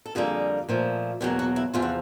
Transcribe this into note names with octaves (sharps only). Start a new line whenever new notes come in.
A4
F2 D3 G3 A#3 G#4
A#2 F3 A3
E2 B2 F#3 A#3 G4
F#4
E4
E2 C3 F3 F4
F#4